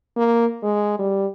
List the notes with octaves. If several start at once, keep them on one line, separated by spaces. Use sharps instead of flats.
A#3
G#3
G3